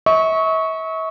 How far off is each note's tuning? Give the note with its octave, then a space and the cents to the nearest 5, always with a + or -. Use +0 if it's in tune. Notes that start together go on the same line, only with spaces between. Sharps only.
E5 -45 C#6 +0